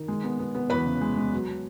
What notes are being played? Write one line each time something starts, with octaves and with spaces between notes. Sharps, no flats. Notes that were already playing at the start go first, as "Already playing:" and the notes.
Already playing: D#3
G#3
B3
B3
B3
E2 B4 B5
C#3
G#3
G#3
F#3